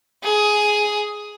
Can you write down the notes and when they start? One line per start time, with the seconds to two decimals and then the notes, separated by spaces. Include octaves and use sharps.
0.23 G#4